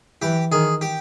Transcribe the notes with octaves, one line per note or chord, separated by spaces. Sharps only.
E3 G4
D#3 G#4
G4